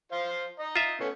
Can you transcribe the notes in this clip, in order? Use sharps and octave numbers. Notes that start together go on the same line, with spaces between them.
F4 C5 F5
D#5 A#5
F4 E5
A3 B3 C#4